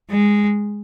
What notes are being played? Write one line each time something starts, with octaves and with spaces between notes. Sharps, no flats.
G#3